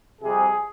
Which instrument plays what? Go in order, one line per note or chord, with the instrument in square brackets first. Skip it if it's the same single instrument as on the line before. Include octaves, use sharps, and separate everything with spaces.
[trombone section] F2 C3 G3 C4 G#4